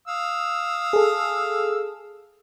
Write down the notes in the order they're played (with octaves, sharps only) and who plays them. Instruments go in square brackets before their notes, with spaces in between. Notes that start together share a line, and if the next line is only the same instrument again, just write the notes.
[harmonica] F5 D#6 E6
[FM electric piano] G#4 A4